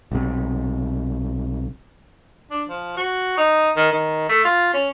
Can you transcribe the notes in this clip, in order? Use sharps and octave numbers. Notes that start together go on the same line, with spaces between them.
B1 C3
D4
F3
F#4
D#4
D#3
D#3
A3
F4
C#4